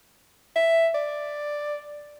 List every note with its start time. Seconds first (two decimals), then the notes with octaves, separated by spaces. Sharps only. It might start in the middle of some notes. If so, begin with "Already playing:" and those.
0.56 E5
0.94 D5